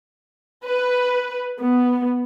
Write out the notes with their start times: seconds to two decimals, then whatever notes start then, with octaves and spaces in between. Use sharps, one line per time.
0.65 B4
1.60 B3